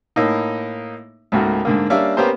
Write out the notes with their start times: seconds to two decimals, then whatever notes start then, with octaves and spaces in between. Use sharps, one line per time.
0.16 A2 A#3 D#4
1.32 C#2 G#2 A3 A#3 F#4 A#4
1.65 G#2 D3 A#3
1.90 G3 A#3 C#4 D4 E5 F5
2.17 A#3 B3 C#4 G4 A#4 C5